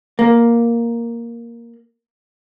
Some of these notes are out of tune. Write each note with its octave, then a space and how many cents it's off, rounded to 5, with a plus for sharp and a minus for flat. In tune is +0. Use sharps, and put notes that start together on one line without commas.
A#3 +5